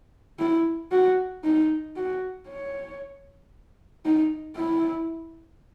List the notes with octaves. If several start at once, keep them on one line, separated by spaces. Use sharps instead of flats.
E4
F#4
D#4
F#4
C#5
D#4
E4